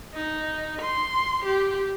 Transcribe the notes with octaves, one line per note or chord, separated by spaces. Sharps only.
D#4
C6
G4